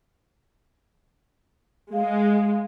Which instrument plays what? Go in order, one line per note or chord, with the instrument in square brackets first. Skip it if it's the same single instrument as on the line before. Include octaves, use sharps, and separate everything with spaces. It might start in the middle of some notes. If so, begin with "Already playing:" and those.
[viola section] G#3 [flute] F5